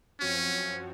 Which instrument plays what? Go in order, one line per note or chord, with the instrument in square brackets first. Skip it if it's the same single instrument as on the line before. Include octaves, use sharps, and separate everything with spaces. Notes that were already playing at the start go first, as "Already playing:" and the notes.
[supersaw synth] F#2 F3 C4 F#4 C#5 [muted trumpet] C#4